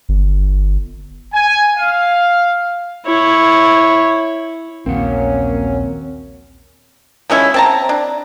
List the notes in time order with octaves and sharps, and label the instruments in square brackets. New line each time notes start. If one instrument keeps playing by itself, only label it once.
[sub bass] G1
[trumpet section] G#5
F5
[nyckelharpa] E4 C#5
[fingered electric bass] A#1 D#2 [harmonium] F#3 C#4 [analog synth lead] A#3 [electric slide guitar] C4 F#5
[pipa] F3 G#3 C#4 E4
C4 A5 A#5
D4